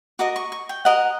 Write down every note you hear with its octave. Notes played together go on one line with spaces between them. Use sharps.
F#4 A#4 D#5 D6
C#6
C#6
G5
F#4 A#4 D#5 F#5